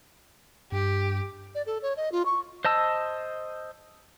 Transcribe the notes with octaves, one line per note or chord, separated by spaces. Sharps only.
G2 G4
D5
A4
C#5
D#5
F4
C#6
C5 D#5 A5 E6